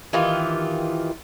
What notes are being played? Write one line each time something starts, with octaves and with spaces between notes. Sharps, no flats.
D#3 E3 F4 G4